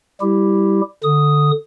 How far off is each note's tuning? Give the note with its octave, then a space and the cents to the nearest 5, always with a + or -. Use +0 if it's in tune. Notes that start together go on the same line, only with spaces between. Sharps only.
G3 +0 E4 +0 G4 +0
D3 +0 D#6 +0